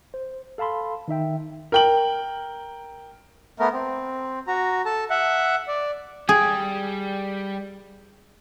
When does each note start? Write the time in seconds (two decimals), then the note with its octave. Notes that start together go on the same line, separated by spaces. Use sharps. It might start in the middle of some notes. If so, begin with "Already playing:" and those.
0.14 C5
0.58 A4 F5 A5 B5 C6
1.08 D#3 D#4 E5 G5
1.72 A#4 G5 F#7
3.60 A3 B3 A#4
3.73 C4
4.47 F#4 A#5
4.86 A4 A5
5.10 E5 F#5
5.68 D5
6.29 G3 G#4 G5